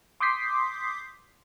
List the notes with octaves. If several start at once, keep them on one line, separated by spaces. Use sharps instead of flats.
C6 D6 D#6 G6 B6 C7